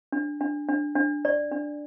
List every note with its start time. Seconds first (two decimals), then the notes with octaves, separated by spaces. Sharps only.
0.12 D4
0.41 D4
0.69 D4
0.96 D4
1.25 D5
1.52 D4